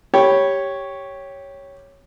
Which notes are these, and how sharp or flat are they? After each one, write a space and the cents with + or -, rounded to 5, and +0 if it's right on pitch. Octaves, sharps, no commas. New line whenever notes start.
G4 +0 C#5 +0 B5 -5